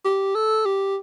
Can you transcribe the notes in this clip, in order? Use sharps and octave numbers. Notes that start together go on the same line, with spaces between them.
G4
A4
G4